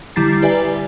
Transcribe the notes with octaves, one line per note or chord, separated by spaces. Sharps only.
D3 G3 E4 A#5 A6 C7
G4 B4 D5 E5 G#5